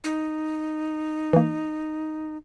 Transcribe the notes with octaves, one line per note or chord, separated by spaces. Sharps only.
D#4
E3 A#3